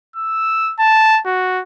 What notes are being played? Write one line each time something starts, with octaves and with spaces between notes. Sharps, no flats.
E6
A5
F#4